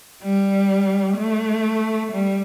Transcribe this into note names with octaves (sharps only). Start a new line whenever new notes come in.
G3
A3
G3